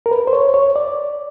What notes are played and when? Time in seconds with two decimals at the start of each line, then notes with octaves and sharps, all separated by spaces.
0.06 A#4
0.11 B4
0.27 C5
0.33 C#5
0.54 C#5
0.76 D5